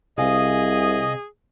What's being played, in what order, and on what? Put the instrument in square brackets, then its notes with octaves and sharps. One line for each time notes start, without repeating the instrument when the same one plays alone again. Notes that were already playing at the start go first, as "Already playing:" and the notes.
[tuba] C2 [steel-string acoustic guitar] C3 F5 G#5 [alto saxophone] G#4 [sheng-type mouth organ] D#5